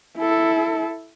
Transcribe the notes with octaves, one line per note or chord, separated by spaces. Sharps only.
E4 A4